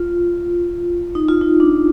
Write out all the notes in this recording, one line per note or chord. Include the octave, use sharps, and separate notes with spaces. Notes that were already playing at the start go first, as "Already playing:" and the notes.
Already playing: F4
D#4
F4
D#4
D4